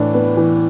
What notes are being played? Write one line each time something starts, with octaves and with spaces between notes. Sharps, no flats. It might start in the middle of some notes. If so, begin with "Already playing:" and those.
Already playing: A2 E3 D4
B3
E3